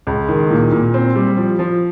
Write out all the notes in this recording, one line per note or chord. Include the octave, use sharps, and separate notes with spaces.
C#2
D#3
A#2
A#2
C4
G3
F3
F3